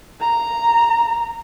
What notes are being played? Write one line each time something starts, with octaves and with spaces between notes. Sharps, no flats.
A#5